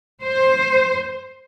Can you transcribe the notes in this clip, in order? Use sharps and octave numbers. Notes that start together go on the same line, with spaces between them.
C5